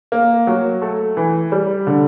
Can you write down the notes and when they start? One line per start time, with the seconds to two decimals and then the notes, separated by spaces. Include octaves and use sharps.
0.12 A#3
0.47 F#3
0.82 A3
1.17 E3
1.52 G3
1.87 D3